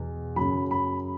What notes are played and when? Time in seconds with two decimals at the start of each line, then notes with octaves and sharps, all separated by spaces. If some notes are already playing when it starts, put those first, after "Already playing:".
Already playing: E2 B2
0.36 F#2 C#3 F#3 B5
0.71 B5